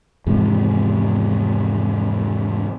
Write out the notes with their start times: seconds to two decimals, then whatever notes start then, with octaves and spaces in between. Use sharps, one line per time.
0.26 E2 G#2 C3 F3